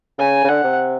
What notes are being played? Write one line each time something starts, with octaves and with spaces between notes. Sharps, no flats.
C#3 G#5
C#3
D3 F#5
C3